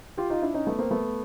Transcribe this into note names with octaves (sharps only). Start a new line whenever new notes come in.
F4 G4
D#4 F4
D4 E4
C#4 D#4
A3 B3
A#3 C4
A3 B3